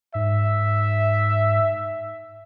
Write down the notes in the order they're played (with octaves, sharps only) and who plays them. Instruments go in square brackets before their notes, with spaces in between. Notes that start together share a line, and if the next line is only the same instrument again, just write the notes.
[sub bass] G#2 [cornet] E5